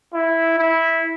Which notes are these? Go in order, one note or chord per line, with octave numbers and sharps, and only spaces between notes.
E4
E4